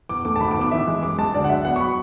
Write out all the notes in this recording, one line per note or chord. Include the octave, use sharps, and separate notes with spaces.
E2 D6
A3 D6
A5
G#1 B5
D6
B3
D6
E3 E5
G#3
F#2 D6
G#3 A5
D2 D5
F#5
F#3 E5
B3 F#5
C#6
F#3 B5